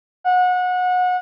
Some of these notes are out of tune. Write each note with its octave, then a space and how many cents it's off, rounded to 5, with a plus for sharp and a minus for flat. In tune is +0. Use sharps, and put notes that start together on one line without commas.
F#5 -25